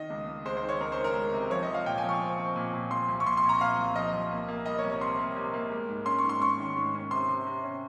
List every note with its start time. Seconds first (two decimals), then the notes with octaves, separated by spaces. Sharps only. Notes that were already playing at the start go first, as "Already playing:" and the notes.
Already playing: D#3 D#5
0.10 C#2
0.27 C#2
0.45 G#3 C5
0.57 C5
0.63 D#3
0.69 C#5
0.80 C#2 A#4
0.92 C5
0.98 D#3
1.04 A#4
1.16 G#3
1.33 C3
1.50 F3 C#5
1.63 D#5
1.68 F3
1.74 F5
1.86 A#2 G5
1.98 G#5
2.04 F3 C#6
2.21 C4
2.38 C4
2.56 A#2
2.74 A#2
2.91 F3 C6
3.08 C2
3.20 C#6
3.26 A#2 C6
3.37 C6
3.43 A#2
3.49 A#5
3.61 A#2 F5
3.78 C2
3.95 F3 D#5
4.14 C2
4.31 A#3
4.48 A#3
4.66 G3 D#5
4.78 C#5
4.83 C2
4.90 C#5
5.01 C3 C6
5.19 A#3
5.36 C3
5.54 A#3
5.71 G#3
5.88 G#2
6.06 C#4 C6
6.19 C#6
6.24 G#2
6.29 C6
6.41 C#4 C#6
6.59 D#3
6.76 G#2
6.95 C#4
7.11 C3 C6
7.29 C3
7.46 C3
7.63 C#4